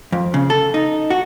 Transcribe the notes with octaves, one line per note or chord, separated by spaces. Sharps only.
F2
C#3
A4
D#4
F#4